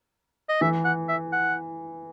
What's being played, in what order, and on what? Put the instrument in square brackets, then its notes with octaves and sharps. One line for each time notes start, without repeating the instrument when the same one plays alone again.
[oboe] D#5
[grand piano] E3 [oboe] E5
[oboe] F#5
E5
F#5